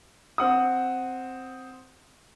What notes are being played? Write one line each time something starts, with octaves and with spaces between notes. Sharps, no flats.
C4 F#5 D#6